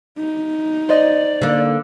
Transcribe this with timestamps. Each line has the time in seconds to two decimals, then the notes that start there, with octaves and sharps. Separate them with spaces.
0.18 D#4
0.89 C5 D5 D#5
1.42 D3 A#3